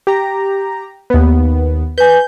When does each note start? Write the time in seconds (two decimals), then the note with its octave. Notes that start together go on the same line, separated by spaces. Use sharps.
0.07 G4 A#5
1.10 D#2 B3
1.98 B4 G#5 G6